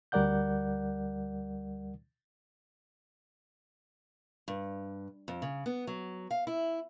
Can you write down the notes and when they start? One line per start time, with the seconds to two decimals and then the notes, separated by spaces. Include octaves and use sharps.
0.12 D2 G3 A#4 D5 F#5 G6
4.48 G2
5.28 F2
5.42 C#3
5.66 B3
5.87 F#3
6.31 F5
6.47 E4